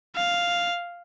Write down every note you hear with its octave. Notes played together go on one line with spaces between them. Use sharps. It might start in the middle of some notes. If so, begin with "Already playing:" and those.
F5